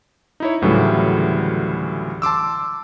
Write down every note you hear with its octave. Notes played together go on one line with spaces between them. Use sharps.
D#4 E4 C#5
D2 A2 C#3 E3 F#3 G3
A5 C6 D6 E6